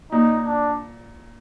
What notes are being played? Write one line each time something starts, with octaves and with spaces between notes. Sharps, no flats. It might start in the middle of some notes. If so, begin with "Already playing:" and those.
A#2 D#4
D4